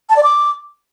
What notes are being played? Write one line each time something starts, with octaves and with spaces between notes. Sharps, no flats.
A5
D5
D6